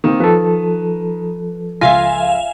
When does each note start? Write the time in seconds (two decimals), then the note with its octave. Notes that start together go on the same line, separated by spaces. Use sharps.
0.04 D#3 A#3 C4
0.20 F3 A4 B4
1.81 C#2 F4 E5 F5 G#5 A#6